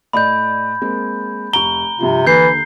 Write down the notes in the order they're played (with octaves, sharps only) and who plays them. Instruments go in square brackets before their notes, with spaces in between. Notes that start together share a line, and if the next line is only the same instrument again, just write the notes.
[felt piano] A2 D5 D#5 [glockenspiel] B5 G6
[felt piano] G#3 A#3 C4
[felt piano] F1 C#6 D7 [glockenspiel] A#5 G7
[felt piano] G2 F3 F4 [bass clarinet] C3
[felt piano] D#2 D3 [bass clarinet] E3 [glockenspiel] G6 C7